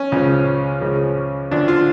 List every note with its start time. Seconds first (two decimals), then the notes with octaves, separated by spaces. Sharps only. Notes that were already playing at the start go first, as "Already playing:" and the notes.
Already playing: C#4
0.12 C#2 C#3 F3
0.81 C#2 C#3 F3
1.51 D2 D3 F3 D4
1.68 F4